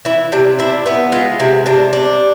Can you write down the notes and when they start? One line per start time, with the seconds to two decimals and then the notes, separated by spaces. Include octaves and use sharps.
0.05 E3 E4
0.32 C3 D4
0.59 D4 E4
0.86 B3 E4
1.12 G#3 F4
1.40 C3 E4
1.66 C3 D4
1.93 D4